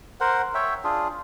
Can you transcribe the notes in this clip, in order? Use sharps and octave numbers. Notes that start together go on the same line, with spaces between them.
A#4 C5 F#5
C#5 E5 G5
D4 F4 G#4